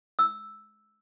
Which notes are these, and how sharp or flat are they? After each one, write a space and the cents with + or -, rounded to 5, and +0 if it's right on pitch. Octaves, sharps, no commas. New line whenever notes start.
E6 -5